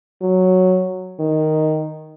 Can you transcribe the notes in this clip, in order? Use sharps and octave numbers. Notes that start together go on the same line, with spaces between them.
F#3
D#3